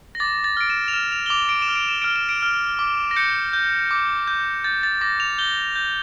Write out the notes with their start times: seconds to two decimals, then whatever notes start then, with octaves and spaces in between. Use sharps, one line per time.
0.15 A#6
0.20 D6 A6
0.44 A6
0.57 F6 D7
0.70 E7
0.88 F7
0.93 F6 E7
1.12 F7
1.26 G7
1.30 D6 F7
1.49 D7
1.62 E7
1.68 F6
1.76 D7
1.89 E7
2.02 F6 D7
2.16 E7
2.29 D7
2.43 F6
2.79 D6
3.11 A#6
3.16 G6 C#7
3.53 G6
3.91 D6
4.28 G6
4.64 G6 A6
4.83 A6
5.01 D6 A#6
5.20 F7
5.38 G6 G7
5.76 G6